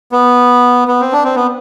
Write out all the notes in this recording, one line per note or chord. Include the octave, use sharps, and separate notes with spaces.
B3
B3
C4
D4
C4
B3